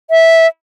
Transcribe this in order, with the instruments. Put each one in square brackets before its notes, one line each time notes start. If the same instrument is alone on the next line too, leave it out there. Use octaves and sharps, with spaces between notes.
[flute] E5